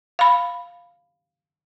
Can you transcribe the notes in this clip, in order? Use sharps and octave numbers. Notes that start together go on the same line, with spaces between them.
F5 B5